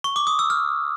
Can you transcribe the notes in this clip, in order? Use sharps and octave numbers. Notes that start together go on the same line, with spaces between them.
C#6
D6
D#6
E6
F6